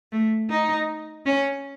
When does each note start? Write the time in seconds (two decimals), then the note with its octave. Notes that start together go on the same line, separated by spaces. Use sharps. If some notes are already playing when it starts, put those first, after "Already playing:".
0.12 A3
0.50 D#4
1.26 C#4